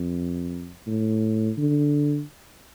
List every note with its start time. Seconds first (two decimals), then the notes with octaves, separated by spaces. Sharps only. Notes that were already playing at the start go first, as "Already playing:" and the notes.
Already playing: F2
0.87 A2
1.58 D3